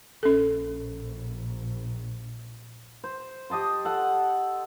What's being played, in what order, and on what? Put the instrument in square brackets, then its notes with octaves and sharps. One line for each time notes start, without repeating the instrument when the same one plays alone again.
[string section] A#1 [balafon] C#4 A4
[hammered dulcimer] C5
G4 D#5 A5 C6
A4 F#5